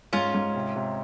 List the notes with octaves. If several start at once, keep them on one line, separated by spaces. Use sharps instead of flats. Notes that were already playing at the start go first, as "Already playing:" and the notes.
G#2 C#4 F4
G#2
C3
C3